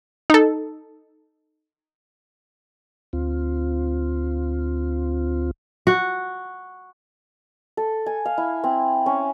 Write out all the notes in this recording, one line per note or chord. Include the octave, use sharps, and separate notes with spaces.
D#4 A4
D2 C4 F4
F#4
A4
G#5
F5
E4
C4
C#4